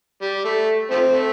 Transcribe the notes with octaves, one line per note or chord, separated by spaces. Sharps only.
G3
A3
F3 A3 C4
A3